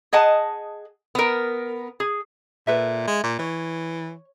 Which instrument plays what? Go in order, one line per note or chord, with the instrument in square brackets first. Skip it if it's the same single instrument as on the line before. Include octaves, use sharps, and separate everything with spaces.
[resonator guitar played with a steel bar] G#4 D#5 F#5 A5
B3 A#4
G#4
[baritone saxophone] A#2 [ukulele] A4 B4 E5
[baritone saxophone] G#3
A#2
[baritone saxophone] E3 [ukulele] C#5